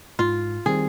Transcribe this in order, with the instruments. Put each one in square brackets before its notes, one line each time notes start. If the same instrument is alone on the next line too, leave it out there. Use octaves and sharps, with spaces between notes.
[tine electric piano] G#2 [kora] F4
[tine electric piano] D#3 G3 C4 [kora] G#4